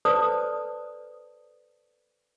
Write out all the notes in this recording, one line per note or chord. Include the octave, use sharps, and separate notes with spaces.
A4 B4 C5 D5 A5 D#6